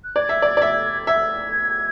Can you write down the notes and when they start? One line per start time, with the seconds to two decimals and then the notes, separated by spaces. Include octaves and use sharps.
0.04 F#6
0.16 D5 G#6
0.29 E5
0.42 D5
0.57 D5
0.62 E5
1.07 E5 G#6